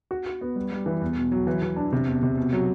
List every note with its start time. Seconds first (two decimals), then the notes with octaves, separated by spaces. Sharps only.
0.11 F#4
0.26 F#4
0.41 B3
0.56 G3
0.72 G3
0.86 E3
1.02 E2
1.17 B2
1.32 F#3
1.47 E3
1.62 E3
1.76 D4
1.93 C3
2.07 E2
2.23 C3
2.37 B2
2.53 F#3